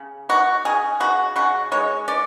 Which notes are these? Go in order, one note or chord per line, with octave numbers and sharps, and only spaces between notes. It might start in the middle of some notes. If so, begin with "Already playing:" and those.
Already playing: C#3
F#3 F#4
C#4 G#4
C#3 F#4
C#3 F#4
G#3 C#5
C#4 D5